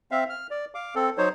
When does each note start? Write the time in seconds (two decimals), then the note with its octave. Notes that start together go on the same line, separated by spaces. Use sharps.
0.11 C4 E5 F5
0.30 F6
0.51 D5
0.75 F5 D6
0.95 C4 A4
1.18 F#3 D#4 C5 C#5